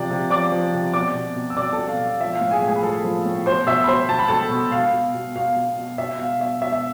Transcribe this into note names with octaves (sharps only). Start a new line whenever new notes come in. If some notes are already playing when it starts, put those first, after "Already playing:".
Already playing: C3 F3 D5
C3
F3 D5 D6
F3
C3
B2 D5 D6
B2
B2
E6
B2 D5 D6
A4 A5
B2
F5
B2 F5
F3 E5
F5
A2
G#4 G#5
A2
G#4 G#5
B5
F3 A4 A5
F3
A2
B2 C5 C6
B2 E5 E6
B5
B2 C5 C6
B2 A5
B5
B2 A4 A5
B2
B2 F5
B2
B2
B2 F5
B2
B2
B2 E5
B2 F5
B2 E5
B2 E5
E5